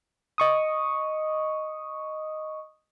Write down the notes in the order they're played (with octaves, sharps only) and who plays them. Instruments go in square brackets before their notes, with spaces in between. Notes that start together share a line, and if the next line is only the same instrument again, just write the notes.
[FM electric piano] D#5 C#6 D#6